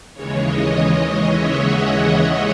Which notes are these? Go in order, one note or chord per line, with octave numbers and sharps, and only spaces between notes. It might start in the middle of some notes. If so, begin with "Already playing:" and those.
D#2 C#3 E3 G#3 C#5
D#5
E5
F#5
E5